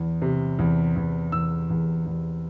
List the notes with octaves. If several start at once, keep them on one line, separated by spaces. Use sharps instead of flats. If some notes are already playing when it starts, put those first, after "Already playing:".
Already playing: E2
C3
E2
E2
E2 E6
E2
E2